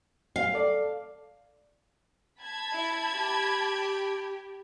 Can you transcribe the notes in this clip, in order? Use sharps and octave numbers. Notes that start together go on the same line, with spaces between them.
F5
A4 D5
A5 B5 G#6
E4
G4